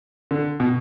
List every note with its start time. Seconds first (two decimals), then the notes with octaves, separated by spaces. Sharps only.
0.31 D3
0.60 B2